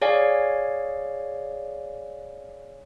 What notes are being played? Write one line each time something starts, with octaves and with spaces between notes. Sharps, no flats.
G#4 C#5 D5 F5 G#5